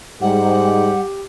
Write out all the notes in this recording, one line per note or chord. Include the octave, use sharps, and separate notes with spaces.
G#2 G3 G4 F#5